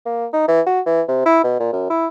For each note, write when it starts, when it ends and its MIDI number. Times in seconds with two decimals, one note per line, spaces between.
0.06 0.26 58
0.33 0.44 63
0.48 0.61 52
0.67 0.80 66
0.86 1.02 52
1.09 1.21 48
1.26 1.42 64
1.43 1.59 47
1.60 1.69 46
1.73 1.86 42
1.90 2.07 64